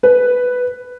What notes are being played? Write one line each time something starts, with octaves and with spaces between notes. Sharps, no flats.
B4